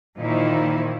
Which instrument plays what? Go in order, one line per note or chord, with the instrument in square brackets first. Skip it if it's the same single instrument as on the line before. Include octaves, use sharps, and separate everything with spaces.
[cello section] A#2 D#3 F3 D#4 E4